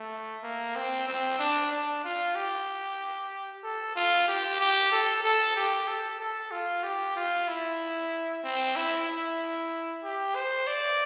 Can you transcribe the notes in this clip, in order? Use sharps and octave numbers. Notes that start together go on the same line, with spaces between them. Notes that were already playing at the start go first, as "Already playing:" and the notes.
Already playing: A3
A#3
C4
C4
D4
D4
F4
G4
A4
F4
G4
G4
A4
A4
G4
A4
A4
F4
G4
F4
E4
C4
E4
E4
G4
C5
D5